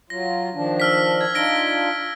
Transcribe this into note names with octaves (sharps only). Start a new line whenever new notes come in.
F#3 F4 A#6
D#3 F3 D4
E6 F6 B6
G#6
D4 D#4 F4 A#6 D7 G7